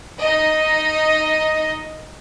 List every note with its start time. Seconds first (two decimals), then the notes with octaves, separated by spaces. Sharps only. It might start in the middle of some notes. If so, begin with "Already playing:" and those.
0.20 D#4 D#5